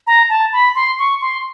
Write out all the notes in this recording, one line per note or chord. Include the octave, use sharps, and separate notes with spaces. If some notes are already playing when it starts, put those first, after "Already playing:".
A#5
A5
B5
C6
C#6
C6